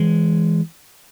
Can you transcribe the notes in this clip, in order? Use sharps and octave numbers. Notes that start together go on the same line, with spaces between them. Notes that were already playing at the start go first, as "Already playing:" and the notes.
Already playing: E3 G#3